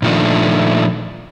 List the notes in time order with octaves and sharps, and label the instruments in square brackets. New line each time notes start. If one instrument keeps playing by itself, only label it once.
[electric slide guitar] A#2 D#3 F3 A3 D4